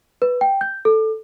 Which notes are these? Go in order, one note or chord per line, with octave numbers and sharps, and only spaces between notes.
B4
G5
G6
A4